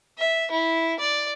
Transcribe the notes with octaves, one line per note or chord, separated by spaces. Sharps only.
E5
E4
D5